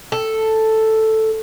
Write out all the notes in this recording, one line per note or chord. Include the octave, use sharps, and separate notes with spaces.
A4